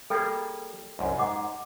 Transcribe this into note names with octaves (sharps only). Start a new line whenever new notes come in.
G3 A#3 G#4 A4 G5
C2 F#2
G#2 D#5 F#5 D6